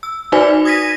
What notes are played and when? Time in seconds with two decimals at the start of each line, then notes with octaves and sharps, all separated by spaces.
0.03 E6
0.32 D#4 F#4 B4 C5 D5 G#5
0.65 D#6 G#6 A#6 B6 D#7